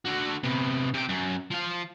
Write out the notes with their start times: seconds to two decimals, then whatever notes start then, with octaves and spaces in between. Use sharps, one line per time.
0.06 D3 F#4
0.43 C3 B3
0.94 C3 G5
1.09 F#2
1.51 F3 F5